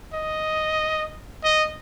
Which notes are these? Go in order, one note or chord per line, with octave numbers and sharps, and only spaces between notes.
D#5
D#5